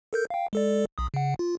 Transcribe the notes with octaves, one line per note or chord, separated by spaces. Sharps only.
A4 A#4 G6
F5 G5
G#3 A4 D5
B1 D#6
C#3 F#5
F4